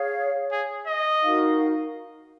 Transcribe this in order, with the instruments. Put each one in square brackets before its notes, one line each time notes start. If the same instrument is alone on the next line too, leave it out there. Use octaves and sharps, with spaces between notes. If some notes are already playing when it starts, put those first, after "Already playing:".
Already playing: [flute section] G#4 C#5 F5
[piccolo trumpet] G#4
D#5
[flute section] D#4 F#4 A#4 F5